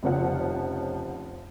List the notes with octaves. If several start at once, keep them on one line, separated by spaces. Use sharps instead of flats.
F1 C#3 F3 F#5